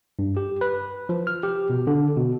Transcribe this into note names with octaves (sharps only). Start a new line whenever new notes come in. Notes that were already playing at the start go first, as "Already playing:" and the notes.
G2
G4
B4
F3
F6
G4
B2
D3
B2